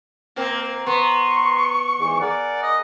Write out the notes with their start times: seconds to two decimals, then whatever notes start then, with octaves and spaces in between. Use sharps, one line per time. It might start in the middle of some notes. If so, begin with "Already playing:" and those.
0.36 A#2 A#3 C4
0.86 B3 A#5 C6 C#6
1.99 E2 G#2 E3
2.21 G#4 A#4 D5 F#5
2.62 D#5